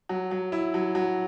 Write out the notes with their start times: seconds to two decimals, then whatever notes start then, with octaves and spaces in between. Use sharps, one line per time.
0.09 F#3
0.31 F#3
0.52 E4
0.74 F#3
0.95 F#3